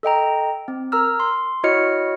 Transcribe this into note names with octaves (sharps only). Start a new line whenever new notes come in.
A4 D#5 G5 A#5
C4
A#4 A#5 E6 F6
C6
E4 F#4 C#5 D#5 F6 C#7